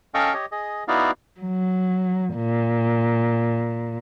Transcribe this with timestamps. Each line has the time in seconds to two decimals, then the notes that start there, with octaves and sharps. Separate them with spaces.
0.14 C#4 A4 D#5 F5 G5 C#6
0.34 G4 C#5 D#5
0.52 G#4 D#5
0.88 B3 D#4 E4 F#4 D5 F5
1.41 F#3
2.35 A#2